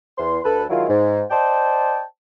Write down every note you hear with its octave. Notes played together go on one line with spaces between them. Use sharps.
E2 C6
D2 A4 B4
D#3 F#3 G#3 E4 F4
G#2
C5 D5 D#5 G5 A5